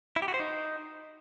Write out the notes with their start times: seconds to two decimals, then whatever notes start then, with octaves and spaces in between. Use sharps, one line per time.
0.16 E4
0.22 G4
0.28 F#4
0.34 C5
0.40 D#4